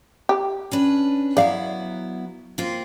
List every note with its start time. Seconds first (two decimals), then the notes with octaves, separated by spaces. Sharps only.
0.29 G4
0.71 C#4 D4 B4
1.37 F#3 B3 E4 D5 F5
2.58 A#3 C4 F4